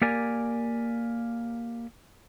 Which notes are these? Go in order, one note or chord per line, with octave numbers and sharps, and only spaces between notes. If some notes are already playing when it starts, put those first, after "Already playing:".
A#3 G4 A#4 D5 G#5